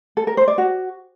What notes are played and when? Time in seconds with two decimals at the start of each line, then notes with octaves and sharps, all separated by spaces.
0.17 A4
0.27 A#4
0.37 C5
0.48 D5
0.58 F#4